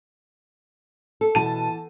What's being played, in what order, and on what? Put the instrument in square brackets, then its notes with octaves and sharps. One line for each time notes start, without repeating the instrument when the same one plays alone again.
[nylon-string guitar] A4
[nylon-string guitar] B2 [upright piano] E3 A5 D#7